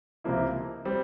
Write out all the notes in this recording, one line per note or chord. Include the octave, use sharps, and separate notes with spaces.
C#2 C3 F3 A#3 E4
G3 C4